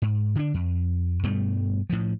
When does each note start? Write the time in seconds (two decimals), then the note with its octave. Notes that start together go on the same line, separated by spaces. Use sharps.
0.02 G#2
0.35 D3 D4
0.54 F2
1.23 G2 B2 G3 A3
1.90 A2 F3